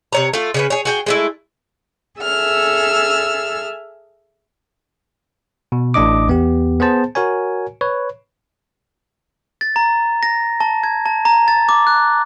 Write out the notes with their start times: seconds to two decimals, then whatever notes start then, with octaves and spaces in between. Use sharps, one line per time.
0.13 C3 C#5 A#5
0.33 A3 F4
0.54 C#3 C#4 B4
0.70 G#4 C#5
0.85 F#4 G#4 G5
1.06 G#3 A3 E4
2.19 G#4 A4 E5 E6 F6
5.72 B2
5.94 A1 A2 D4 D#5 D6
6.28 E2 B3 G4
6.80 B3 G#4 C5 A5
7.15 F#4 A#4 C#5 G#5
7.81 B4 C#5
9.61 A6
9.76 A#5
10.23 A#6
10.60 A5
10.83 G#6
11.06 A5
11.25 A#5
11.48 A6
11.69 D6
11.87 F#6